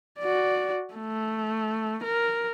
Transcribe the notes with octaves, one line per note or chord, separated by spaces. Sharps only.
F#4 D5
A3
A#4